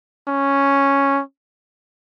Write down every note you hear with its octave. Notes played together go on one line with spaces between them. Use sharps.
C#4